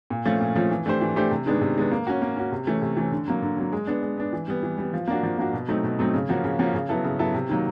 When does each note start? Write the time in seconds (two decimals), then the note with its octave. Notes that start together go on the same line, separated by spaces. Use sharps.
0.10 A#2
0.26 F3 A3 C#4 F4
0.41 A#2
0.56 F3 A3 C#4 F4
0.71 E3
0.86 A3 D4 G4 C5
1.01 E3
1.16 A3 D4 G4 C5
1.31 C3
1.46 D#3 G#3 B3 D4
1.61 C3
1.76 D#3 G#3 B3 D4
1.92 A#3
2.07 C#4 F#4
2.22 A#3
2.37 C#4 F#4
2.52 C3
2.67 E3 A3 C#4
2.82 C3
2.97 E3 A3 C#4
3.12 D3
3.28 F#3 A#3
3.42 D3
3.57 F#3 A#3
3.72 G#3
3.87 B3 D4
4.02 G#3
4.18 B3 D4
4.33 E3
4.48 G3 B3
4.63 E3
4.78 G3 B3
4.93 F3
5.08 A#3 D4 F#4
5.23 F3
5.38 A#3 D4 F#4
5.53 B2
5.68 F#3 A3 C4 D#4
5.83 B2
5.99 F#3 A3 C4 D#4
6.14 C#3
6.29 F3 A#3 C#4 F#4
6.44 C#3
6.59 F3 A#3 C#4 F#4
6.74 C#3
6.89 F#3 B3 E4 A4
7.04 C#3
7.19 F#3 B3 E4 A4
7.34 C3
7.49 D#3 F#3 A#3